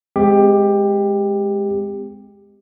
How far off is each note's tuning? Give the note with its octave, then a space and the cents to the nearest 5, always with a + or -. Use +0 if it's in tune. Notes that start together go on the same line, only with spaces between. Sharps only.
G#3 +0 C4 -40 G4 +15